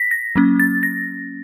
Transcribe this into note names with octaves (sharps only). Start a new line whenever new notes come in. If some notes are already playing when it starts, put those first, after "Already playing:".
Already playing: A#6 B6
A#6
F#3 A#3 C#4
A6
A#6